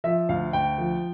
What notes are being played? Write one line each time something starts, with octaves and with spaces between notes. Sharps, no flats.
F3 E5
D2 F5
D2 G5
F3